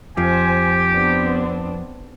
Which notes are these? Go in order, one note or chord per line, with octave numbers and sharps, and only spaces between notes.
F2 F3 G4 C5 G#5
B3 C4 D4